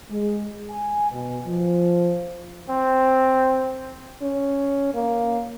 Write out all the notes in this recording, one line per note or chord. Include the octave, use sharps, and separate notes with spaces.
G#3
G#5
B2
F3
C4
C#4
A#3